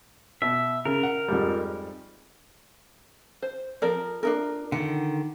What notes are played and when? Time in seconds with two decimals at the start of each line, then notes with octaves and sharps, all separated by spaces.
0.42 B2 E5
0.85 C#3 A#4
1.03 F#5
1.28 F2 G#2 G3
3.42 C5
3.82 F3 C4 A#4 D5
4.23 D4 D#4 A#4
4.72 D3 D#3 F#5